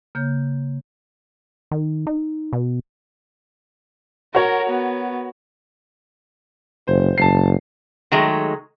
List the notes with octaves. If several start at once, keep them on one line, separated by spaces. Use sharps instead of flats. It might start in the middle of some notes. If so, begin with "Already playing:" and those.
C#3 A#3 C#5 G6
D#3
D#4
B2
F#4 A#4 C#5
B3
F#1 C5
F#1 A5 C7
D#3 F#3 G#3 A3